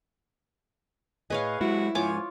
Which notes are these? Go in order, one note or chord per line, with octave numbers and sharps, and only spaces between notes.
A2 G#4 B4 C#5 D#5 F5
F#3 G#3 E4 F#4
G#2 F3 F4 C#5 G#5 D6